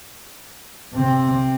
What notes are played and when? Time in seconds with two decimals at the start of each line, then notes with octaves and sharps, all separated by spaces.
0.93 C3 C4